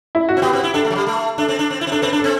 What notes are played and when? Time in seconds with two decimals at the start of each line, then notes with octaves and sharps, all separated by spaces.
0.15 E4
0.29 F#4
0.37 C4
0.42 B3 G4
0.53 C4
0.63 E4
0.74 D4 A4
0.85 A3
0.91 F#3
0.96 G3
1.07 A3
1.38 D4 A4
1.48 C4
1.59 D4
1.70 C4
1.81 E4
1.87 C4
1.92 D4 A4
2.02 C4 B4
2.13 D4
2.19 C4 A4